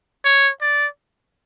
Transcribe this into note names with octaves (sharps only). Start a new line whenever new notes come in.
C#5
D5